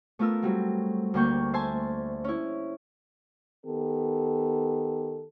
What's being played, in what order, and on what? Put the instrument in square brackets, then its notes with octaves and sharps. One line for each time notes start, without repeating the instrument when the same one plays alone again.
[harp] A3 B3 F4 A#4 E6
F#3 G3 C4
D2 A3 A#3 G5 C#6 G6
C5 E5 G#5 A5 C6
C#4 E4
[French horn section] D#3 B3 G4 A4